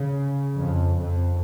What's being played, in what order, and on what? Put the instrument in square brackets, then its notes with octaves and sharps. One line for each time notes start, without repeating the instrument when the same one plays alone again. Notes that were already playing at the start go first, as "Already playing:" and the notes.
Already playing: [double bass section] C#3
F2
F2